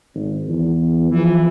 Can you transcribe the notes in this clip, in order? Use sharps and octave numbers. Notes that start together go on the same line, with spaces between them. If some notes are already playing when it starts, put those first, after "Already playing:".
G#1
E2
E3 F3